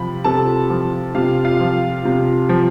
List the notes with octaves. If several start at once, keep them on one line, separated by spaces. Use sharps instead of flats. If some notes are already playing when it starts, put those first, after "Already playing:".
Already playing: C3 F3 B5
C3 A4 A5
F3
C3 F4 F5
F4 F5
F3
C3
F3